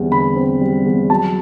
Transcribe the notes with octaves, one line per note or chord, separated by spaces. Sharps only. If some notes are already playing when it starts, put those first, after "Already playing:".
Already playing: E2 D3 G3 C4
D3 B5
C4
G3
E2
F#3 A5